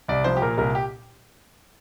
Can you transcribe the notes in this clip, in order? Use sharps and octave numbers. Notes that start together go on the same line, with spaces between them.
C2 D5
F3 C5
G4
A#2 A#4
C2 A#4
G4